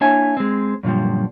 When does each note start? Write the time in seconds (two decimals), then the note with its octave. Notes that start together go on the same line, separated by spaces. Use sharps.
0.01 A#3 D4 E4 C#5 E5 G#5
0.37 G#3 C4
0.83 F#2 A#2 D3 F3 G3